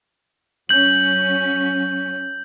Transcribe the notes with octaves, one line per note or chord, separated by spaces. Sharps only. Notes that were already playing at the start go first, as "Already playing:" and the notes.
F#3 C#4 G6 F#7